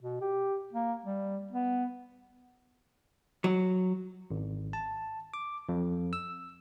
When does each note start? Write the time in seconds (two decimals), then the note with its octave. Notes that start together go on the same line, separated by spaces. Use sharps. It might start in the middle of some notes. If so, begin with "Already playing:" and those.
0.01 B2
0.21 G4
0.73 A#3
1.05 G3
1.52 B3
3.44 F#3
4.31 G#1
4.73 A5
5.34 D6
5.69 F2
6.13 E6